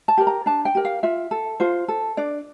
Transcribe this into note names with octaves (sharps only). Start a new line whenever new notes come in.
A5
G4 A#4
A#5
D4 A5
G5
G4 A#4
F5
F4 E5
A4
F4 C5
A4
D4 D5